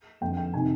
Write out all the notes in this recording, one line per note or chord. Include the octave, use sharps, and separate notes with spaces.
F2 D3 G5
G5
C3 D#3 G#5